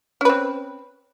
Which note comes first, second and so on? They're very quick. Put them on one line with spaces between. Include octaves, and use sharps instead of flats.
C#4 B4 C4